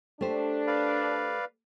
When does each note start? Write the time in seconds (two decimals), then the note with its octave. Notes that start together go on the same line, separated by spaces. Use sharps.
0.21 A3 D4 G4 C5
0.67 B4 D5 F5